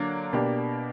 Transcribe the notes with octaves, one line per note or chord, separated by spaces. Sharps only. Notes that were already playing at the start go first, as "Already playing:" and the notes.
Already playing: D3 F#3 A#3 D4
B2 A#3 D4 G4